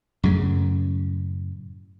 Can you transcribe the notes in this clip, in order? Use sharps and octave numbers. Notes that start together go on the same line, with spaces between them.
F#2 A2 C#3